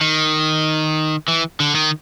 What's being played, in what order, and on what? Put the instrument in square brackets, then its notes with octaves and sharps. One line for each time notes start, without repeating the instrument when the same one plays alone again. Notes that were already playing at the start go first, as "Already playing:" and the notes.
[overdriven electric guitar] D#3
E3
D3
D#3